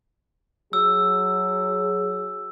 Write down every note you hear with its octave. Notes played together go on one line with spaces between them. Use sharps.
F#3 G#4 E6